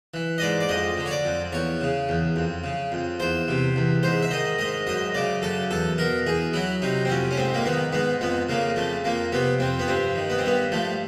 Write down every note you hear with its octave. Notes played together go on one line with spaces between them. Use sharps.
E3
D#5
G#2 D5
D5
F2 D#5
D3
C#5
D5
F2
E2 C#5
C#3
E2
F2
C#3
F2
E2 C5
C3
E2
G#2 C5
E5
D#3 D#5
G#2 D#5
F#2 D#5
C#3 D5
F#2 A4
E2 A4
B2 A#4
E2 G#4
F#3 E4
C3 D#4
C4
F2 C#4
C#4
G#2 C4
A#3
D#3 B3
G#2 B3
F2 B3
C#3 A#3
F2 A3
F2 A#3
C3 B3
F2 C4
B3
G2 C4
D#3
B3
C4
G2 B3
F3 A3